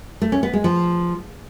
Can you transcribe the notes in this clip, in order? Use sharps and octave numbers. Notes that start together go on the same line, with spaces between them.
A3
C#4
B3
G#3
F3